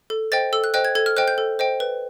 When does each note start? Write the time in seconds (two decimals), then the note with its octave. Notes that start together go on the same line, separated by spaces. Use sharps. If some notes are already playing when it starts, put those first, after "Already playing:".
0.10 A4
0.32 C5 D#5 G5 A6
0.53 A4 E6
0.64 F#6
0.74 C5 D#5 G5 F#6
0.85 G#6
0.95 A4 G#6
1.06 F6
1.17 C5 D#5 G5 F#6
1.28 G6
1.38 A4
1.59 C5 D#5 G5
1.80 B4